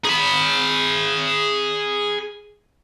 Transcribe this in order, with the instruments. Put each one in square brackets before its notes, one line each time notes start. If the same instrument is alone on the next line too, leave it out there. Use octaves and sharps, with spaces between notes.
[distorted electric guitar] G#4 B5